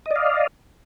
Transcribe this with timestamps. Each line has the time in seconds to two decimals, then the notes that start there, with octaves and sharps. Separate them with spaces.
0.06 D#5
0.11 D5
0.16 F5